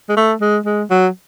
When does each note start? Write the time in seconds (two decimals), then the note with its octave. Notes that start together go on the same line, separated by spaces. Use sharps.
0.09 G#3
0.17 A3
0.41 G#3
0.66 G#3
0.90 F#3